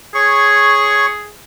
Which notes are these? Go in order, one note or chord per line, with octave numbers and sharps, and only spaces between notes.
G#4 C#5 C#6